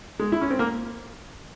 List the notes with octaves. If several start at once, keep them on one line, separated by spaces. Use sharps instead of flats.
G#3
E4
C#4
C4
A#3